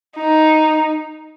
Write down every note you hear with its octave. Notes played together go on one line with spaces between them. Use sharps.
D#4